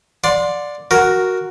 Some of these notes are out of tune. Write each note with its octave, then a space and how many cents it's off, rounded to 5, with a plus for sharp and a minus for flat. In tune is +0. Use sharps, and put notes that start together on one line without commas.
D5 +0 F#5 -40 C6 +0
F#4 +0 A#4 +0